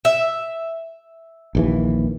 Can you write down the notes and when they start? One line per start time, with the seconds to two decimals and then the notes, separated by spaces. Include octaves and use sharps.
0.05 E5
1.55 A#1 D#2 E3